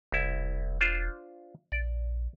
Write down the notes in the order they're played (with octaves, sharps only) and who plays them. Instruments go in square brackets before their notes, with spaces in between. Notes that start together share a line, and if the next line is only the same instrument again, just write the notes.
[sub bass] E1 [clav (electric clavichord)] C2 E4
[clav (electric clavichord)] D4 F4 C5
[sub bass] A#1 [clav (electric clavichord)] D5